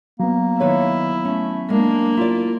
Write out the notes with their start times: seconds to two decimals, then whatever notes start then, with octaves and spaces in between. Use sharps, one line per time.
0.20 F#3 A#3 B3
0.60 D#3 E4 B4 C#5
1.25 A3 C#4
1.70 G#3 A#3 D4
2.17 E4 F4 D5